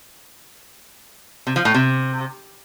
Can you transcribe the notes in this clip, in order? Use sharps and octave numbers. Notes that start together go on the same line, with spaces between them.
C3
F3
A2
C3